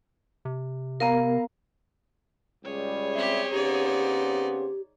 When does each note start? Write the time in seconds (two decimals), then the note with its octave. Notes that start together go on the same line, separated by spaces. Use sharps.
0.45 C3
1.00 B3 A#4 F5 A#5
2.65 C#2 G3 G#4 C#5
3.14 C4 G4 E5
3.52 C#3 B3 C4 D#4 G4 D5